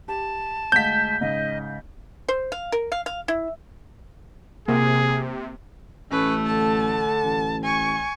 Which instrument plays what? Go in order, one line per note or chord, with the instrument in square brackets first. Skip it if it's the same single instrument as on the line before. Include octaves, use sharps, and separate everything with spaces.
[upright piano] G4 [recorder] A5
[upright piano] D2 G#3 F5 [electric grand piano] G6 B6
[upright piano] G#2 C#3 F5 [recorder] D#5
[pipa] C5
F5
A#4
F5
F5
E4
[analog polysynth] C3 [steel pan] A#3 [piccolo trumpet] G#4
[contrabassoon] A1 [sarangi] A3 [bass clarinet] C#4 [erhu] B4
[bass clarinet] D3 [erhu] A5
[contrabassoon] A1
[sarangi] G#5 [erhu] C#6